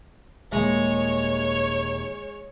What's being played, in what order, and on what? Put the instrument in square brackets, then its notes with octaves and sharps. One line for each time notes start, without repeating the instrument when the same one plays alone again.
[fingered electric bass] D#1 D#3 A#3 [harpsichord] G#3 [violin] C#5